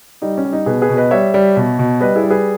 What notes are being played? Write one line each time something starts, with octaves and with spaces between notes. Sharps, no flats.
G3 D#4
C#4
G3
D#4
B2 G#4 B4
G#4 B4
B2
B4 D#5
G3 C#5 E5
G3
B2
B2
G3 B4 D#5
E4 G#4
G3
G#4 B4